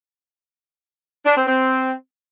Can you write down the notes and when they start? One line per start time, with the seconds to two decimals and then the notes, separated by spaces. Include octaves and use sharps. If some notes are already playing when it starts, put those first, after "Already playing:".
1.26 D4
1.36 C4
1.47 C4